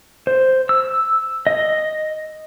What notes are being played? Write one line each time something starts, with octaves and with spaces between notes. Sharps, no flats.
C5
E6
D#5